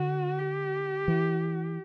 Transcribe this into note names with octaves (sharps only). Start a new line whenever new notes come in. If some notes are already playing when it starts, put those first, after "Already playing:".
Already playing: D3 F#4
G4
E3